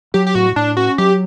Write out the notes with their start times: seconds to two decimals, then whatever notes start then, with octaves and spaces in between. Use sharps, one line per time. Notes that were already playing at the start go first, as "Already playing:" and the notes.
0.14 F#3 G4
0.27 G4
0.35 A2 F#4
0.56 A2 D4
0.77 C#4 F#4
0.98 F#3 G4